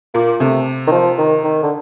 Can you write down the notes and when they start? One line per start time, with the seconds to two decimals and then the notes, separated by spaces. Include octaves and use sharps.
0.14 A#2 A#3
0.40 C3 A3
0.88 D#3
0.92 F3
1.19 D#3
1.44 D#3
1.63 D3